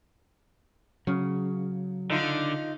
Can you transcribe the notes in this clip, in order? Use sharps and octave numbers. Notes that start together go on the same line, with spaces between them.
C#3 F#3
D3 D#4 F4